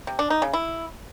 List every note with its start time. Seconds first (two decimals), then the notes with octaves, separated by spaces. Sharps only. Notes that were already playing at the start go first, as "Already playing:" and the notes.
0.07 C3
0.19 D4
0.30 D#4
0.42 C#3
0.53 E4